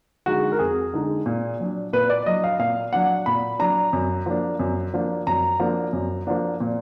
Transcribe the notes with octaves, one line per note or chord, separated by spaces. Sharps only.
D3 G#3 D#4 F#4
A#4
F2 G#4
D3 G#3 D#4
A#2
F#3 D4
A#2 B4
D5
F#3 D4 D#5
F5
A#2 F5
F#3 D4 F#5
A#2 B5
F#3 D4 A#5
F#2
F3 A#3 D4
F#2
F3 A#3 D4
F#2 A#5
F3 A#3 D4
F#2
F3 A#3 D4
A#2